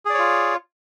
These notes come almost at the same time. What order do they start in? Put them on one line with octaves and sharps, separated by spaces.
G#4 D5 C#5 F4